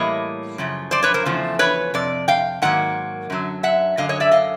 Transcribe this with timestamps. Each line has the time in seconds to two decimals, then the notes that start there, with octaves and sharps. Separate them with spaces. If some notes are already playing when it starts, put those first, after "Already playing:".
Already playing: A2 E3 G3 A#3 C#5 D#5
0.58 F#2 C#3 F3
0.91 C5 D5
1.03 B4 C#5
1.14 A#4 C5
1.26 E2 C#3 F3 A3
1.59 B4 C#5
1.94 F2 C3 D5
2.28 F5 G5
2.62 G#2 D#3 F#3 A#3 F#5
3.30 F#2 D3 F#3
3.63 E5 F#5
3.97 F#2 D3 F#3 D#5 F5
4.09 C#5 D#5
4.20 D5 E5
4.32 D#5 F5